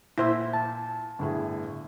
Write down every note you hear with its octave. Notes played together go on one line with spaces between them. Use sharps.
A#2 E4 C5 E5
A5
G1 A2 G#4